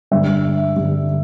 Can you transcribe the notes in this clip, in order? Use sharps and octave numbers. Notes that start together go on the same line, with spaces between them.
G2 D3 G3 E5
G2 D3 G3